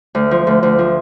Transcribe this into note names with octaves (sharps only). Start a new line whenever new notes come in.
D2
F3
D2
D2
F3